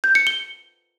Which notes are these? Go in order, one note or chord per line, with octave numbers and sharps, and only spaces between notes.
G6
C#7
G7